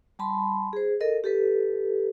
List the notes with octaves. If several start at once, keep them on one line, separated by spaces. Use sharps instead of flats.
G3 A5 B5 C6
G#4 C5
A4 A#4 D#5
G4 A4 B4